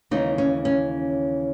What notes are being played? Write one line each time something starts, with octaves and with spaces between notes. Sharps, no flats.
D#2 C#3 E3 G#3 D#4
C#4
C#4